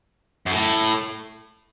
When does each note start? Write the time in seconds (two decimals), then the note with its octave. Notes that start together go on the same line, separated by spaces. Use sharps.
0.46 F#2
0.51 A2